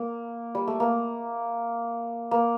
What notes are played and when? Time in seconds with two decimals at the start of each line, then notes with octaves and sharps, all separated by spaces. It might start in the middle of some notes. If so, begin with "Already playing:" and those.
Already playing: A#3
0.55 G3
0.68 A3
0.80 A#3
2.31 A#3